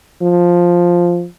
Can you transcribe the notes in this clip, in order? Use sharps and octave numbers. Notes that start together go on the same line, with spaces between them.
F3